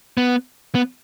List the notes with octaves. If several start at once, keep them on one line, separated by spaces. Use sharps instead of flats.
B3
B3